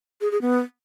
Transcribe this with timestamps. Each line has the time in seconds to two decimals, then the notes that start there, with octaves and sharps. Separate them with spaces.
0.21 G#4
0.31 G#4
0.42 B3